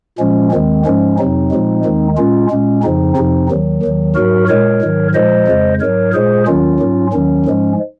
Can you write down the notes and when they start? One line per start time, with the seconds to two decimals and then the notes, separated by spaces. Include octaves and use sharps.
0.19 A#2 F3 G#3 C#4
0.52 D#2 D#3 G#3 C4
0.85 G#2 F3 G#3 C#4
1.18 F2 C3 F#3 C4 D#4
1.51 A#2 F3 G#3
1.84 D#2 D#3 G#3
2.17 A#2 G#3 C#4 F4
2.50 A#2 G#3 C#4
2.83 F2 C#3 F3 C4 D#4
3.16 F2 C3 F3 C4 D#4
3.50 D#2 D#3 F#3
3.83 D#2 D#3 F#3
4.15 G#2 F#3 F#4 A#4
4.48 A#2 G#3 A#4 C#5
4.82 G#2 D#3 F#3
5.14 A#2 F3 G#3 C5 D#5
5.47 F2 C#3 G#3
5.81 G#2 F#3 A#4 C#5
6.14 A#2 G#3 G#4 C5
6.47 D#2 D#3 F#3 C#4 F4
6.80 G#2 F#3
7.13 D#2 D#3 F#3 C#4
7.46 G#2 F3 G#3